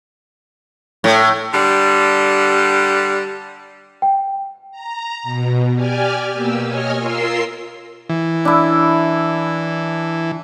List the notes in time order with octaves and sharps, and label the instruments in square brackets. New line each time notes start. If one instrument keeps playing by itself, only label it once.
[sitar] A2
[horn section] D3 G3
[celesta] G5
[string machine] A#5
B2
G4 D5 G#5 F6
B2 A#3 G4 E6
C#5 D#5 G#5 F6
F4 A#4 C6 E6 C7
[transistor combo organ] E3
[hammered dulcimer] D4 E4